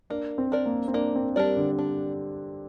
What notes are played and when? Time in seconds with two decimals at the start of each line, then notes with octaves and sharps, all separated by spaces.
0.10 A#3 D4
0.38 C4
0.52 D4 A#4 D5
0.66 A#3
0.88 C4
0.94 A#3 D4
1.16 C4
1.36 G3 D4 A#4 D5
1.57 D3
1.79 D4